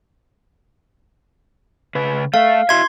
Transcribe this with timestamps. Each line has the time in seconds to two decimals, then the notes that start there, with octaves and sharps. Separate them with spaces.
1.95 C#3 B4
2.34 A3 A4 E5 F5
2.69 E4 F#4 E5 C6 G#6